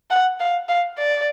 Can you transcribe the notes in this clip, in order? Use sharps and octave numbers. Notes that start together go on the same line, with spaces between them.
F#5
F5
F5
D5